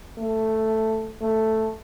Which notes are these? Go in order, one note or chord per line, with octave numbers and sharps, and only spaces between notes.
A3
A3